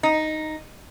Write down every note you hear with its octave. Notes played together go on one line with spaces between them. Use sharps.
D#4